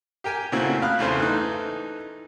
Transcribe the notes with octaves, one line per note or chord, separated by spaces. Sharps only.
G4 A#4 G5 G#5
A#2 C#3 A3 C4 E4 F#4
F5 B5 D#6 F#6
E2 C#3 A3 C5
E3 D#4 A4 F#6